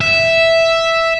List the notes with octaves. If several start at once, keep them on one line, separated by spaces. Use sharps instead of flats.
E5